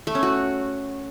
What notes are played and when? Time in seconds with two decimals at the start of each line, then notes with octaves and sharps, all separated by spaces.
0.07 A3
0.15 C#4
0.23 F#4